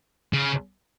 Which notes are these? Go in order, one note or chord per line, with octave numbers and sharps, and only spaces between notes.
C#3